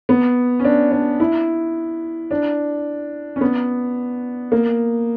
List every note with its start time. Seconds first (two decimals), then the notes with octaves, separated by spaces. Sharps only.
0.09 B3
0.60 C#4
0.65 D4
0.92 D4
1.20 E4
2.31 D4
3.36 C#4
3.41 B3
4.52 A#3